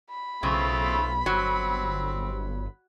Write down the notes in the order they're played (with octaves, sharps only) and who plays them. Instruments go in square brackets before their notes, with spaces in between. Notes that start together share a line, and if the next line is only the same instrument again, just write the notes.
[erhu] B5
[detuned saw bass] B1 [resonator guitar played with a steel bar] C#3 [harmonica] A3 C4 F4
[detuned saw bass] G1 [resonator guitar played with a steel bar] F#3 [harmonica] C4